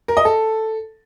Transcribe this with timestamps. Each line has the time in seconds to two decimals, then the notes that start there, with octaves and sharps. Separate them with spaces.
0.08 A#4
0.17 D#5
0.25 A4